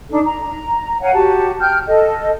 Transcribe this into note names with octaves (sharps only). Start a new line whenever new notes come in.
D4 D#4 A4
A#5
C#5 F5 F#5 G#5
F#4 G4 A5
G5 F6 G6
A4 D#5